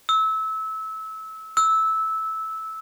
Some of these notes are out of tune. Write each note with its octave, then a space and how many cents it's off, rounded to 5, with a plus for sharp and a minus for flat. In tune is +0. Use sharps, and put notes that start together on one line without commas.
E6 -25
E6 -15